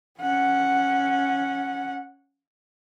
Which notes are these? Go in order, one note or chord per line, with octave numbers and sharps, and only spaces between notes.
C#4 F#5